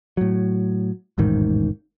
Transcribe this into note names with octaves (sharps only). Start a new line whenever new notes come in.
A2 F#3
E1 A1 G#2 D#3